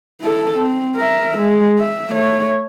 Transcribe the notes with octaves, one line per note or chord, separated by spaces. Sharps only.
E4 A4
C4
A#4 E5
G#3
E5
A3 C#5